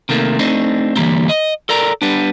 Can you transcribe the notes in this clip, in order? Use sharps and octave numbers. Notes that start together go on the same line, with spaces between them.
C3 D#3 A3 A#3
A3 C4 D4 D#4
D3 E3 G3 A#3 C4
D#5
A4 A#4 D5 A#5
G3 B3 D4